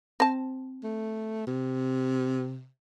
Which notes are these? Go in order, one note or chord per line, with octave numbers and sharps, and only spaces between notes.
C4 A5
A3
C3